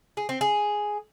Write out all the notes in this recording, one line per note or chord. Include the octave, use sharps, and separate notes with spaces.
G#4
C4
G#4